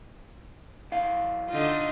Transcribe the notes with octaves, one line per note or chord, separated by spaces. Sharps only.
B1 E4 F5
D3 D#4 F4